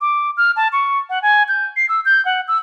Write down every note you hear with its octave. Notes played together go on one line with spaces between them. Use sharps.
D6
F6
A5
C#6
F#5
G#5
G6
C7
E6
G6
F#5
E6